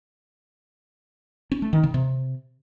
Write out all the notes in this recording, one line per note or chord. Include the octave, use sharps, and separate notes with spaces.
C#4
A3
D#3
C#3
C3